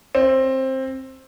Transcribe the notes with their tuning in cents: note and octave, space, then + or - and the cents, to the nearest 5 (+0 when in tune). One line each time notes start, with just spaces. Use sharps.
C4 +15